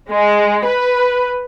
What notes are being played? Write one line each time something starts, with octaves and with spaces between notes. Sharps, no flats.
G#3
B4